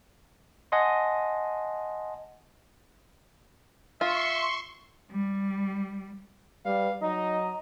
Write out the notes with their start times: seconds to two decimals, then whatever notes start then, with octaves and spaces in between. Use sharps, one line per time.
0.72 D#5 F#5 G#5 A5 C6
4.01 F4 E5 C6 C#6
5.12 G3
6.65 G3 B4 F5
7.02 F#3 D#4 D#5 A#5